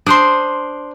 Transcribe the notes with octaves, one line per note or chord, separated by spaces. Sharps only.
D4 C5 C6 D#6